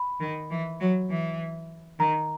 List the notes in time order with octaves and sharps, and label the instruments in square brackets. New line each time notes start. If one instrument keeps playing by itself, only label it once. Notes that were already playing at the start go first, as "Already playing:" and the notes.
Already playing: [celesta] B5
[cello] D#3
E3
F#3
E3
[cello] D#3 [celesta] A#5